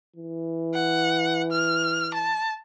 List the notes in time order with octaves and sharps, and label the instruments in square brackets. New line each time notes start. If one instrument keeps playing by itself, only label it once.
[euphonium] E3
[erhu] F#5
F6
A5